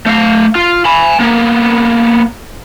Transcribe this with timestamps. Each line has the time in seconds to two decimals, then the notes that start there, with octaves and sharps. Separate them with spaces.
0.06 A3 F5
0.56 F4
0.85 G#5 B5
1.20 A#3 B3